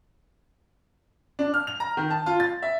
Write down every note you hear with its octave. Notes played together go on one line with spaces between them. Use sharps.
D4
F6
F7
A#5
D#3
A5
F4
A6
E5